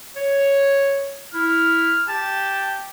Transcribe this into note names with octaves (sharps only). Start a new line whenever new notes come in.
C#5
E4 F6
G4 A5